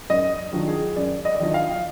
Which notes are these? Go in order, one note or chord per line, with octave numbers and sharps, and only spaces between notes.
F#2 D#5
D#3 F#3 D4 F4
G#4
F#2 D5
D#5
D5
D#3 F#3 D4 F4 D#5
F5